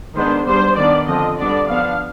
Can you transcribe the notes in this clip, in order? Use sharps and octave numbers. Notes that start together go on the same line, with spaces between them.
D#3 G#3 B3 D4 C5
G3 B3 D4 C5
D#3 B3 D4 D5
D3 F3 C4 D#5
D3 G3 B3 D4 D5
F3 B3 D4 F5